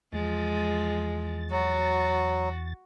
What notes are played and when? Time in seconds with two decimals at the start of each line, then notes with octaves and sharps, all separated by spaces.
0.13 E2 F3 G#3 A6
1.51 F#3 F#4